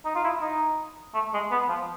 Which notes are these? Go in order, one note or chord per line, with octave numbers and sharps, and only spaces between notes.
D#4
F4
E4
D#4
A3
G#3
B3
F3